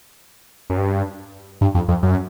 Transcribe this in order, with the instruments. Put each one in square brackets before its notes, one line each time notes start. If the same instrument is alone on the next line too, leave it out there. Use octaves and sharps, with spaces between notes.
[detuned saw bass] F#2
G2
G2
F2
F2
F#2